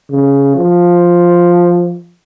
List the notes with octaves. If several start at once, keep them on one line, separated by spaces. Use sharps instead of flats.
C#3
F3